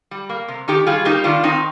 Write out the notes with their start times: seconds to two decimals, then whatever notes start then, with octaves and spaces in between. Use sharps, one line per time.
0.11 G3
0.29 A#3
0.48 C3
0.68 D#3 D#4 G4
0.87 G3 F4 G#4
1.05 A#3 D#4 G4
1.24 D#3 D4 F4
1.43 D#3 C4 D#4